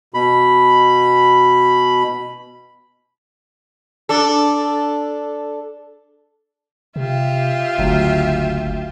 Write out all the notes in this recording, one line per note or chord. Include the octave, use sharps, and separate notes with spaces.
B2 B5
D4 A4
C3 F4 G4 E5
F#1 D2 F#3